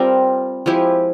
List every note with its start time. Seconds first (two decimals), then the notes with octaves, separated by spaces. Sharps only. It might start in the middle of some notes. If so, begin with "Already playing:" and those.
Already playing: G3 C4 F4 A#4
0.66 F3 G#3 E4 G4